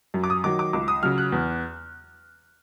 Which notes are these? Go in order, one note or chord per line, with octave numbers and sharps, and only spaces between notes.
F#2
D6
D#6
D#3 F#3 D6
D6
C#2 D6
D#6
C#3 F#3 F6
F#6
E2